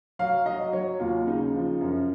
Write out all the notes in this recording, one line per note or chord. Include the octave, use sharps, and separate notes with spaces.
F#3 F5
F#3 D#5
F#3 C#5
D#2 F4
C#3 D#4
F3
F#2